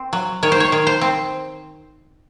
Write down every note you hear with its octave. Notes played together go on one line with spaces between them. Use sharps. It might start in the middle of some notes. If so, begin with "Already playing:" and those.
Already playing: C4
F#3
D#3 C#5
C5
C#5
D#3
C5
C4